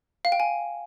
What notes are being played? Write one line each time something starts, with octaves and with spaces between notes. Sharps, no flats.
F5
G5
G#5